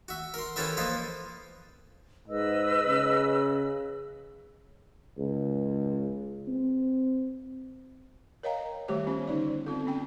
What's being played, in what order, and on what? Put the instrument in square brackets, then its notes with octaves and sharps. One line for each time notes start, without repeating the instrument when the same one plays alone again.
[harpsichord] F#4 E5
A#4 C6
C#4 E4 G4 A4 B4 E5
F3 A#3 B4 D#5
[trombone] G#2 [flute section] B4 D#5 E6
[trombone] C#3
[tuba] C#2
C4
[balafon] A#4 C#5 D#5 F5 G5 A#5
D#3 G3 A3 G4 C#5 D6
B3 C#4 F4
D3 C#4 D#4 D5
C4 F4 A4
B3 C#4 G5